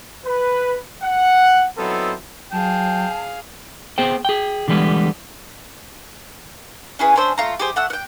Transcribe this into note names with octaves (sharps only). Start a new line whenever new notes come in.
B4
F#5
F#3 B3 C4 D#4 E4 A4
F#3 G#4 F5 G5 A5
B3 G#4 C5 G5
G#4 G5
D3 E3 G3 G#3 B3
C#4 E4 G#4 B4
C#4 D4 C5 E6
A3 F4 A#5
G4 G#4 C5
A3 F#5 E6
F#5 G5